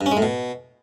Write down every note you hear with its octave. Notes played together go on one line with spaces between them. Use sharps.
G2
C#4
G#3
A2
B2